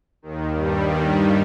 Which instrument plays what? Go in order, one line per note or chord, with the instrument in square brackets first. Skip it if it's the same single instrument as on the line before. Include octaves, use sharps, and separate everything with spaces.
[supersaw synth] D#2 D#3
G2 G3
D#2 D#3